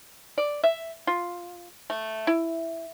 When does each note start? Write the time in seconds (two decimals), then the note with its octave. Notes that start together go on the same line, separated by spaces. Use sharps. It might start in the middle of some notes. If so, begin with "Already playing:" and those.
0.38 D5
0.64 E5
1.07 F4
1.90 A3
2.27 E4